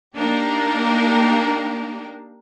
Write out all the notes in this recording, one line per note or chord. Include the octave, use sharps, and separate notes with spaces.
A#3 D4 D#4 G4 A#4